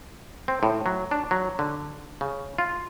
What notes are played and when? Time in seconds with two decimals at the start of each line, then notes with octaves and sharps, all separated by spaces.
0.48 C4
0.63 A2
0.86 F#3
1.11 D4
1.31 F#3
1.59 D3
2.21 C#3
2.58 F4